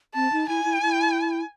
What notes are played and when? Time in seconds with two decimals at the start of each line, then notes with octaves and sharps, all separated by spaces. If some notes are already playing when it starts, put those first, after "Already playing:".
0.15 C4 A5
0.32 D#4
0.49 E4 G#5
0.65 E4
0.82 E4